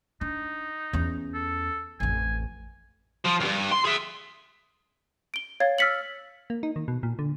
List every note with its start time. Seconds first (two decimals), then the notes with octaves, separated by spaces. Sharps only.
0.21 D4 D#4
0.93 E2 C#4
1.35 A4
2.00 A1 F2 G#5
3.25 F3
3.40 C#2 G2
3.72 C6
3.85 G#4 E5
5.34 D7 G7
5.60 C#5 F5 G#6 A6
5.78 E6 F6 A6 B6 C#7 F#7
6.50 A#3
6.63 D#4
6.76 D#3
6.88 B2
7.03 A#2
7.19 D3